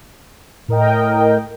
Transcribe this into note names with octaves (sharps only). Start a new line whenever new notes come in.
A2 A#4 D#5 G5